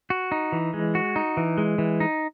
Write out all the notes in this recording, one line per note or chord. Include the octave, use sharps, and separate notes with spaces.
F#4
D#4
E3
G#3
F#4
D#4
E3
G#3
E3
D#4